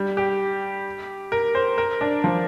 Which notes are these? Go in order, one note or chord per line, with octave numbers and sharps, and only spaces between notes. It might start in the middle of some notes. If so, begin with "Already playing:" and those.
Already playing: G3
G4
A#4
C5
A#4
D4
F3